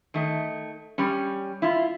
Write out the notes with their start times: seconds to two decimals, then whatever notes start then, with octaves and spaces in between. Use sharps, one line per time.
0.14 D#3 A3 D#5
0.98 G3 C#4
1.62 E4 F4